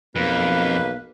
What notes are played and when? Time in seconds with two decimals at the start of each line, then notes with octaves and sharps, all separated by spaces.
0.16 B1 F2 A#3 B4